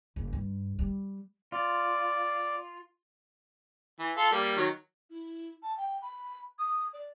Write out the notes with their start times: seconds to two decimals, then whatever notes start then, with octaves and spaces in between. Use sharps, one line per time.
0.16 F#1
0.33 G2
0.79 G3
1.52 F4 D5
3.99 E3
4.17 F4 A4
4.31 G3 A#3
4.57 D#3 F#3
5.10 E4
5.63 A5
5.77 G5
6.02 B5
6.59 D#6
6.93 D5